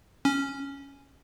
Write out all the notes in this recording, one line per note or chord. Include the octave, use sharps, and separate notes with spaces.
C#4